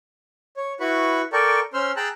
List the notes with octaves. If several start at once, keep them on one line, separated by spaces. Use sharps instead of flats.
C#5
E4 F#4 B4 B5 C#6
A4 A#4 D5 G5 C#6
C#4 C5 C6 E6 F6
G#4 G5 A5 A#5 E6 F#6